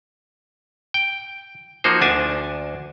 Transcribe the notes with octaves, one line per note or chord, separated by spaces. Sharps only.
G5
F3 A#3 D#4 F#4 C5
D2 D4 G#5 A5